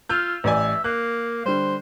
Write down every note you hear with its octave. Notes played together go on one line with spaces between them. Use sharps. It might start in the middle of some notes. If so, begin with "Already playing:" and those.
F4 E6 F6 G6
A1 D5 E5 G#5
A#3 F#6
D3 G3 C5